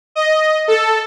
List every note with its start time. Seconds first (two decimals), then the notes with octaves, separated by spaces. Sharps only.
0.15 D#5
0.68 A4